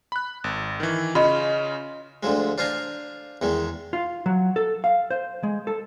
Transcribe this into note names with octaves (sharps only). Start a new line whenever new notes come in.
B5 F#6
G#1
D#3 E3
C#3 C#4 F4 D#5 C6
D2 D3 F3 G#3
D4 F4 C5 F5 G#5 A#5
E2 D#3 G#3
F4
F#3
A4
F5
C5
G#3
A4